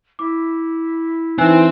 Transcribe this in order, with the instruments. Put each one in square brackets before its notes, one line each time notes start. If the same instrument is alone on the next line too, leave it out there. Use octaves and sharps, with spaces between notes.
[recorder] E4 [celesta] D6
[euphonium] E3 [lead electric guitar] C4 [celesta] D#4 G#5 F#6